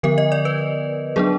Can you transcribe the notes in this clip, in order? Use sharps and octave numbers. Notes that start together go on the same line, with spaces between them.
D3 F3 B3 A#4
D#5
D5
B4
F#3 B3 D4 G#4